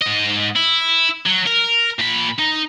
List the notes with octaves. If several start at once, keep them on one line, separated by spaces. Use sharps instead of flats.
G#2 D#5
E4
F#3
A#4
A#2 B5
D#4